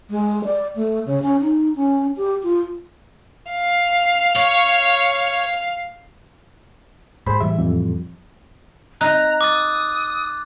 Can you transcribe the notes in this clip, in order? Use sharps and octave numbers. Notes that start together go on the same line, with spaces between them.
G#3
D5
A3
C#3
C#4
D#4
C#4
G4
F4
F5
C#5
G#2 G#4 C5 B5
A2 E3 G3 E5
F2
D#4 A#5 F#6
D6 D#6 A6